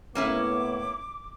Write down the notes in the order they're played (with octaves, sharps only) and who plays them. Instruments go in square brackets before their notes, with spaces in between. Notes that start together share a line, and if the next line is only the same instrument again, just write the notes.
[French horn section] A2 B3 [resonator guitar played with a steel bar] A#3 C#4 E4 [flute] D6